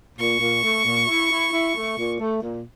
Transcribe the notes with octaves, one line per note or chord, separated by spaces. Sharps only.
A#2 C#6
A#2
A3
A#2
E4
E4
E4
A3
A#2
A3
A#2